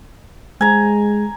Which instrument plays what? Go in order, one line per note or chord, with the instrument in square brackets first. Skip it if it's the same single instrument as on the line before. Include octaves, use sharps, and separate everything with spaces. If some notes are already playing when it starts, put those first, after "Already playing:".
[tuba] G#3 [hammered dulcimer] G#5 A#5